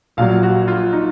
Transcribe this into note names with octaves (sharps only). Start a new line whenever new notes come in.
A#1 A#2 F#3 F5
F#4
F4
D#4